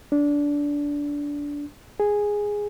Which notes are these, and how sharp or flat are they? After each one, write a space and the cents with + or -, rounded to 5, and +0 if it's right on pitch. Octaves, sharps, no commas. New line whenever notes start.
D4 -15
G#4 -5